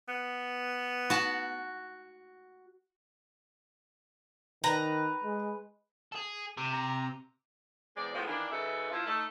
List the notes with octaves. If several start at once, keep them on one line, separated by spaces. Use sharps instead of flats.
B3
F#4 A5
D#3 B4 A#5
G#3
G#4 A4
C3
A#5
E2 G#3 C4 D5
F#2 A2 F3 G#3 B3 F4
D#3 E3 A#3 D4
F#2 C#3 D#4 A4 B4 E5
F3 E4 F4
A3 D#4 A4